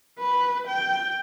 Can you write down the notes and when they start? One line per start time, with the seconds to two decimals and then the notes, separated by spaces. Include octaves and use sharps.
0.20 B4
0.68 G5